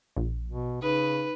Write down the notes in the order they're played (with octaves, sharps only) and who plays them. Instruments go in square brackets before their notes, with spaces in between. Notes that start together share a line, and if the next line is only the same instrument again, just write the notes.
[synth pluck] A#1
[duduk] B2
[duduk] C#3 [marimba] D#4 [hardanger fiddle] B4